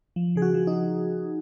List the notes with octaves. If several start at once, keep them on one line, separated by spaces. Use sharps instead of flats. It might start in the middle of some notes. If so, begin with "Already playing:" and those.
F3
C#3 G#4
F#4
F3
D#4